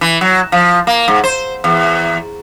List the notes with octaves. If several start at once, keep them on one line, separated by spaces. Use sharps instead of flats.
E3
F#3
F3
A#3
G#2
C5
E2